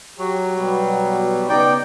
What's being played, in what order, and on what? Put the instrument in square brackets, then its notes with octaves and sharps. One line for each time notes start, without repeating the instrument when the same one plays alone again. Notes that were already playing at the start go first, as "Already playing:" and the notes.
[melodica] F#3 [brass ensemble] G4
[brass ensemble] B2 G3
[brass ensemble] C#3 B3 D#4 [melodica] D5 G5